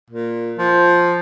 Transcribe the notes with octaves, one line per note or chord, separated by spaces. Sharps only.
A#2
F3